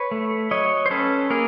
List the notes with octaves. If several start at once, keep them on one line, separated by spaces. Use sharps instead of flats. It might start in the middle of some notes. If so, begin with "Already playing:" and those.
Already playing: B4 C#5
A3
F#3 C#5 D#5
C5
C#4 A4 B4
A#3 G#4 A#4